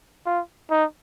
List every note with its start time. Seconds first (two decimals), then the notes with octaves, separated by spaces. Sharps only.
0.26 F4
0.70 D#4